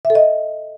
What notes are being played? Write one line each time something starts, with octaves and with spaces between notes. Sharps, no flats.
E5
A4
D#5